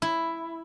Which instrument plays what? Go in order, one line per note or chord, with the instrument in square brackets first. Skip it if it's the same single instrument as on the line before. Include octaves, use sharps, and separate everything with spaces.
[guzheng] E4